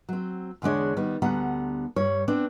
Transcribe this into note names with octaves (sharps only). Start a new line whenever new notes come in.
F#3 C4
E2 D3 G#3 D4 C#5
D#3 G3 B3
D2 D3 G3 B3 F#5 A#5
G2 G3 C#5
B3 C4 D4